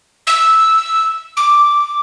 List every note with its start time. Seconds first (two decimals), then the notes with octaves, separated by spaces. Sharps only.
0.27 E6
1.37 D6